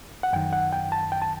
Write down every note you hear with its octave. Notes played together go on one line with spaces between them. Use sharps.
F#5
F#2 D#3 G5
F#5
G5
A5
G5
A5